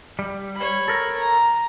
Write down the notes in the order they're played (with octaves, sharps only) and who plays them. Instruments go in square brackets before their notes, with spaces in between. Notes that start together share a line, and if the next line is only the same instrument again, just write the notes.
[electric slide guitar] G3
[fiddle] C#5 B5
[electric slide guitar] A4 A#4
[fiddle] A#5